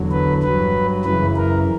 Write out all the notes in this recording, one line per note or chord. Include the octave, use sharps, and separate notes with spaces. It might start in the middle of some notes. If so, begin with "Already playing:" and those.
Already playing: E2 D3 F#3
B4
G2 F#3 B4
F#2 C#3 E3 B4
A#4